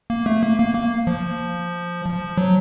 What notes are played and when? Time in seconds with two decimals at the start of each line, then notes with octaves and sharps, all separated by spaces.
0.10 A#3
0.26 A3
0.43 A#3
0.59 A#3
0.74 A#3
1.07 F3
2.06 F3
2.37 F#3